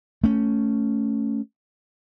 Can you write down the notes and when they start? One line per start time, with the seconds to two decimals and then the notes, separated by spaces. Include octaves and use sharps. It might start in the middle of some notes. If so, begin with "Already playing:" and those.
0.24 A3 C#4